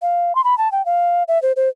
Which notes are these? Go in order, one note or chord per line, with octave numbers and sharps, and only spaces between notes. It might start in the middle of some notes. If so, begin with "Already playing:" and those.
F5
C6
B5
A5
G5
F5
E5
C5
C5